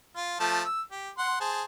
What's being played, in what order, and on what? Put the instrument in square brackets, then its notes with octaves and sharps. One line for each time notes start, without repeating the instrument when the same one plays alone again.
[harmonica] F4
F3 A3 A5
E6
G4
F#5 C6
G#4 C5 A5